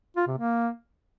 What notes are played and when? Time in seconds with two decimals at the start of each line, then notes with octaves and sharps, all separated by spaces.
0.17 F4
0.27 C3
0.38 A#3